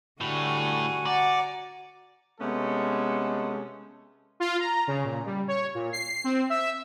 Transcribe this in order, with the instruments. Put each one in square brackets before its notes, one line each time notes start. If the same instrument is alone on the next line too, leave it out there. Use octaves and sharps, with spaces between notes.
[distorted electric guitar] A2 [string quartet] D3 G3 C#6 [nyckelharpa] F#4 G#5
[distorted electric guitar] D5 [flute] F#5 [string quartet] A#5
[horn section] C3 G#3 A3 B3 C#4 A4
[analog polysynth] F4
A#5
C#3
A#2
G3
C#5
A#2
C7
C4
E5